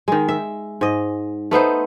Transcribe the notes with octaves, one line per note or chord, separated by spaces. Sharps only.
D#3 G#3
E5
G#2 D#5
A3 B3 D#4 C5